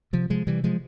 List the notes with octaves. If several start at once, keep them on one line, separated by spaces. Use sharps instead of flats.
C3 F3
C3 F3 G#3
C3 E3 G3
F3 G#3